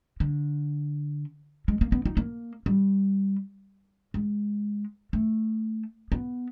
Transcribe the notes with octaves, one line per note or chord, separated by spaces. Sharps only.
D3
G#3
A#3
B3
D#4
A#3
G3
G#3
A3
B3